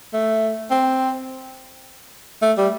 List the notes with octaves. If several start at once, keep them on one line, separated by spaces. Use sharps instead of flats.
A3
C4
A3
G3